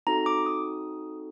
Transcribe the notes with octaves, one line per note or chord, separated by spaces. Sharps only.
C4 D#4 F#4 A4 A#5
D6
D#6